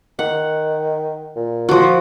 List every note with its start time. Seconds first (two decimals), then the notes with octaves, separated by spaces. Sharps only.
0.19 D#3 F#5
1.36 A#2
1.69 F3 F#4